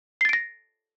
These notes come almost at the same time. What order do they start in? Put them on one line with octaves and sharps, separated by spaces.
C7 A6 D7 A#6